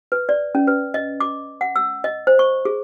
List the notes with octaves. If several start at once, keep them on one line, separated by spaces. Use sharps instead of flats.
B4
D5
C#4
B4
D#5
D6
F#5
E6
D#5
C5
C#6
G#4